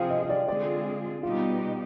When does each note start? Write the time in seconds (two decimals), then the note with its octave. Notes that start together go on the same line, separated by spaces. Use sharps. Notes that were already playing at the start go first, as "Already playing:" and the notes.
Already playing: C3 F3 C4 F4 G#4 F5 G5
0.10 D#5
0.23 D#5
0.29 D5
0.48 D3 G#3 C4 F4 G#4 D5
1.23 B2 G3 B3 D#4 F4 G4